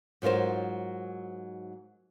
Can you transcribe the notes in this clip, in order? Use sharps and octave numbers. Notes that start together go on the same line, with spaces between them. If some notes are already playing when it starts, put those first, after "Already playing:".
G#2 F#3 F4 A#4 C5